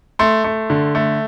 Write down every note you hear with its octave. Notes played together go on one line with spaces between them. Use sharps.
A3 C6
A3
D3
A3